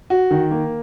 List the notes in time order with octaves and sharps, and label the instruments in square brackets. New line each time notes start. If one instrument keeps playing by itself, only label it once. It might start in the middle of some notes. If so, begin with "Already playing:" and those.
[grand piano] F#4
D#3
A#3